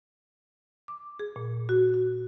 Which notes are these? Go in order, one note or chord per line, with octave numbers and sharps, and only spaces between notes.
D6
G#4
A#2
F#4
F#4